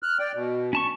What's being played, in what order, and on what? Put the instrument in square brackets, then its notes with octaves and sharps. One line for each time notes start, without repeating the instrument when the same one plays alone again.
[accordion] F6 F#6
D5 G5
B2
[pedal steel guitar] C#4 A5 C#6